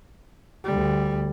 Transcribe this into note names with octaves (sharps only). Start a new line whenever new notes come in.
D2 G3